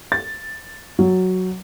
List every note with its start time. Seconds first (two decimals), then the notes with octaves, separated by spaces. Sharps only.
0.12 A6
0.99 F#3